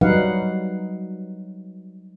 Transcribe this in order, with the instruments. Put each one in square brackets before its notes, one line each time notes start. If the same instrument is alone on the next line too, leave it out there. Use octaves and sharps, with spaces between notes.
[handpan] F#3 G3 D#4 B4 F5 F#5